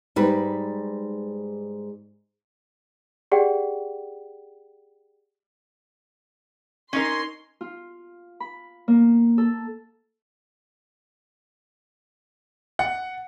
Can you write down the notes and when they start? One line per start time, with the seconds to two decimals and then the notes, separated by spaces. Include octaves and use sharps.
0.16 G#2 G3 B4
3.32 G4 G#4 D5 F#5 G5
6.93 C#4 D#4 A#4 C6
7.61 F4
8.40 B5
8.88 A#3
9.38 A4
12.79 F#5